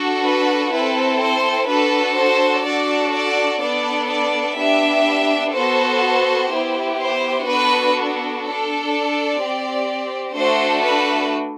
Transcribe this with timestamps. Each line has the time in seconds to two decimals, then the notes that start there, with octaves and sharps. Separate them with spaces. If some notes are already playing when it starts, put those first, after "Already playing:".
Already playing: D4 F#4 A4
0.24 B4
0.72 C4 E4 A4 B4
1.21 C5
1.68 D4 F#4 A4 B4
2.16 C5
2.65 D4 F#4 A4 D5
3.13 D5
3.61 B3 D4 A4 D5
4.09 D5
4.57 B3 D4 G4 E5
5.53 B3 F#4 A4 C5
6.50 B3 E4 G4
6.99 C5
7.46 B3 D4 F#4 A4 B4
8.43 D4 A4
8.92 D5
9.40 C4 G4
10.36 A3 D4 F#4 A4 C5
10.84 B4